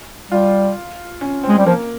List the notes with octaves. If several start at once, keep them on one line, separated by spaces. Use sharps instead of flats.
G3 F4
C#4
C4
G#3
G3
F3 A#3